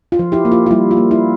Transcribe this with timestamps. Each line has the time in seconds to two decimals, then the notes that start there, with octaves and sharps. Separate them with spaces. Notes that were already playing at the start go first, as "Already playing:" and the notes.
0.12 F4
0.19 F3
0.32 E4 G4
0.45 A#3
0.52 F4
0.66 F4
0.71 G3 E4
0.91 F4
0.97 A#3
1.11 E4